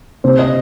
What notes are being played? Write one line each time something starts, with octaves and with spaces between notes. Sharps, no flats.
C3 C5
D#5